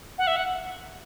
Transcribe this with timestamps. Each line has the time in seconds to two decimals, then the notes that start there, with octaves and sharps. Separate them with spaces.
0.18 F#5
0.27 E5
0.36 F#5